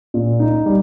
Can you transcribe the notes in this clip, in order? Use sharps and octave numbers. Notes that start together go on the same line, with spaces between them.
A#2
D#4
G3